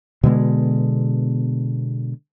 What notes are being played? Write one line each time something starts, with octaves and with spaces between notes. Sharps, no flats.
B2 D3 G#3 B3